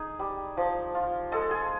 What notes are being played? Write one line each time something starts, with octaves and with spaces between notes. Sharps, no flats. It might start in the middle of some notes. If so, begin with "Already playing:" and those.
Already playing: D#4 G#4
G3
F3
F4
G#3 A4
G#4